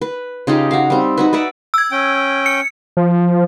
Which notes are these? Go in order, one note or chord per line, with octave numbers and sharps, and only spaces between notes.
B4
C#3 D#4 F4 G4
F#4 F5
G3 C4
D#4 F#4 B4
B4 D5 E5 F#5
E6 G#6
C#4 G5
C#7
F3